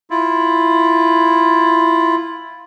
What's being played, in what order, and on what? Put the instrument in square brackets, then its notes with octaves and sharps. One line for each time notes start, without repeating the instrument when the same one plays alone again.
[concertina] E4 F4